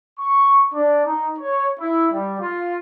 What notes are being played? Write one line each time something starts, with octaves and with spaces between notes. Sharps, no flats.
C#6
D4
D#4
C#5
E4
G3
F4